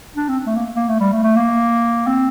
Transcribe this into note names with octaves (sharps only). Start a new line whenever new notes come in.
D4
C4
A3
A#3
A#3
A3
G3
A3
A3
A#3
C4